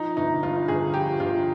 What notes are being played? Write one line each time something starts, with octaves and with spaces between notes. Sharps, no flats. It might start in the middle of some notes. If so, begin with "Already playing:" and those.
Already playing: F3 D#4
G1 D#4
G2 F4
G1 G#4
F3 G4
G1 F4